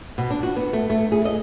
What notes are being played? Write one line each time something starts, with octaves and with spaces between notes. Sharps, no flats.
B2
D4
F#4
B3
A3
A3
G#4
D#5